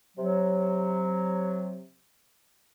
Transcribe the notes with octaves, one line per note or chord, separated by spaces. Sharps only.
C3 F#3